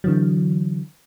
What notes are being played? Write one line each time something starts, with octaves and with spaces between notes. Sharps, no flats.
D3 E3 F#3